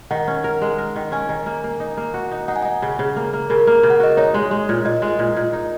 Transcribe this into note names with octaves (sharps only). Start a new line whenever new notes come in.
D#3 F#5
C#4
A#4
G#3
A#4
D#3
C#4 G#5
D#3
A#3
A#3
D#4
A#3
F#4
D#4
D#4 F#5
G#5
D#4 F#5
C#3
C#3
A#3
A#3
C#3 A#4
A#3
C#3
F#5
F#4 D#5
D#4 C#5
G#3
G#3
A#2
A#2 D#5
D#5
G#3
D#5
A#2
A#2
D#4